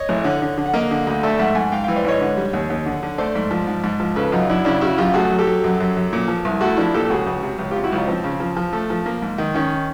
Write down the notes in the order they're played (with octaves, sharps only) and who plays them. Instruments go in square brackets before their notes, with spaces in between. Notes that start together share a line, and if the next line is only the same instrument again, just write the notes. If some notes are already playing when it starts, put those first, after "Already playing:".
Already playing: [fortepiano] C#5 D#5
A1
D3
D3
D3
F#5
A#3 D#5 F5
D3
D2
A3 D5 E5
G#2 E5 F#5
G#2 F#5 G#5
G#2 F5 G5
E3 F5 G5
C5 D5
G#2 C#5 D#5
D3
G3
D#2
D#2
D3
D3
A3 C5 D5
G#2
F3
G#2
G#2
F3
C#3 A4 B4
F#2 D#4 F4
F#2 D4 E4
C#3 D4 E4
C#3 E4 F#4
F#2 F4 G4
A3 F#4 G#4
F#3
G4 A4
F#3
F#2
F#2
F#2
A#2
F3
C2
A3 E4 F#4
F3 D4 E4
A#2 G4 A4
A4
C#2 F#4 G#4
C#2
C3
C#2
C3 F4 G4
E4 F#4
C#2 D#4 F4
F3 C4
C#3
F3
F3
A3
F3
A#3
G#2
D#3
D#3 C#4